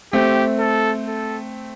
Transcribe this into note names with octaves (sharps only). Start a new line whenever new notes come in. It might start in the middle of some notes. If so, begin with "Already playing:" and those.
A3 C4 G4
A4
A4